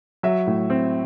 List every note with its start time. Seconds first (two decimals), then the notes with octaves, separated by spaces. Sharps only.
0.23 F#3 E5
0.47 A2
0.70 C4